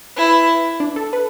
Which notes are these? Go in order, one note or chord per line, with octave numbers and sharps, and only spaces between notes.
E4 B4
D4
A4
B4